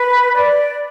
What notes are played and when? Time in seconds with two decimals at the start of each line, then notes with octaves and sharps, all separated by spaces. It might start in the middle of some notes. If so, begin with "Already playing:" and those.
Already playing: B4
0.34 D5